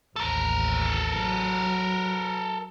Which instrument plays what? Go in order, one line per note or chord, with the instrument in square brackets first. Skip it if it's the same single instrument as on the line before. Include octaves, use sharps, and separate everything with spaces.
[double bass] A1 D#2 [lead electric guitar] A4 A#4
[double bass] F#3